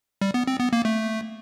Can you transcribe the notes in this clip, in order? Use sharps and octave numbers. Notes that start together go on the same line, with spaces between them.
G3
B3
C4
B3
A#3
A3